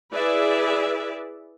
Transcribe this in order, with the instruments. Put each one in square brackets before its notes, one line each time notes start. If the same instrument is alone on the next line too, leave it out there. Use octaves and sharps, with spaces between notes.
[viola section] E4 G#4 B4 D5 E5